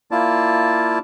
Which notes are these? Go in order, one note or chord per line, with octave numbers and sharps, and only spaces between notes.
A#3 E4 F4 D5 A5